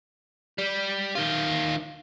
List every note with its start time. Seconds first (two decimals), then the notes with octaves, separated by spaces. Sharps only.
0.58 G3
1.15 D#3 F4